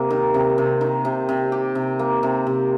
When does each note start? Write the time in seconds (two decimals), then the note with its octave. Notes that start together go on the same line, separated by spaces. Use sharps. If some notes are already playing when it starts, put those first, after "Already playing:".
Already playing: C3 A#3
0.10 D#3
0.34 C3
0.58 C3
0.81 D#3
1.05 C3
1.29 C3
1.52 G4
1.75 C3
1.99 A#3
2.23 C3
2.47 C3